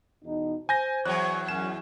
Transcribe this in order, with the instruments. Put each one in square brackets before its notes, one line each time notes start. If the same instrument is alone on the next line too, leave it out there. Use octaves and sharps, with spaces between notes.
[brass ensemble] E2 B2 D#4
[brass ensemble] C5 [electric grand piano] G#5 G6 A#6
[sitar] E2 F#3 [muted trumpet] C#5 [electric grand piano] F#6
[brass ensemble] F#2 [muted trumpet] C#4 [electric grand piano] E7